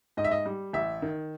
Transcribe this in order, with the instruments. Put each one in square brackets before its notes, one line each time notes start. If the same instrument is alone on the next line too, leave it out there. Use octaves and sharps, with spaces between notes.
[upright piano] G#2 D#5
E5
D#5
G3
A1 E5
D#3